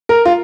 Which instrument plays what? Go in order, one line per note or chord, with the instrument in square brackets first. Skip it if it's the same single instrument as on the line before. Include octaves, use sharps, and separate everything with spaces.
[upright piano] A#4
F4